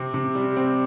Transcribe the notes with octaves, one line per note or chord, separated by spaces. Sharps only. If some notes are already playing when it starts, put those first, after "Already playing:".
Already playing: C3 C4
C3
G3
C4